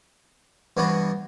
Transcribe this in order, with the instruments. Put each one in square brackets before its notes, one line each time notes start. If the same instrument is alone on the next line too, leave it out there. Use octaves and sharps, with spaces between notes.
[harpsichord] G2 E3 B3 D4 F#4